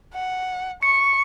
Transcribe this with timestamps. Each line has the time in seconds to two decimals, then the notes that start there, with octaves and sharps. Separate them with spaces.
0.14 F#5
0.83 C#6 C#7